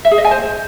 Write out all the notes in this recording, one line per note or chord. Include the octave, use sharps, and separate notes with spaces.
E5
G#4
D#5
G#5
C5